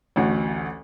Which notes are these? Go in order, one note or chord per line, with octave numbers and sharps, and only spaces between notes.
A1 D2 F#4